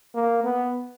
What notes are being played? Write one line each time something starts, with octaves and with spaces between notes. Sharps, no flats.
A#3
B3